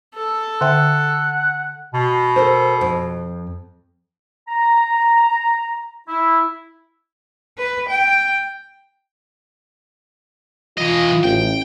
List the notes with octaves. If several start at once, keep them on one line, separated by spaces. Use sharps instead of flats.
A4
D3 E5 F#5 G5
B2
A4 A#4 C5
F2
A#5
E4
B4
G5
E3 F4 D#5
A1 G5